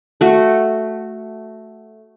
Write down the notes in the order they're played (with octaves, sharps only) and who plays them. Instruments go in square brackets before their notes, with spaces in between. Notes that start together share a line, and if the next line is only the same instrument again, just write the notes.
[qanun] A3 F#4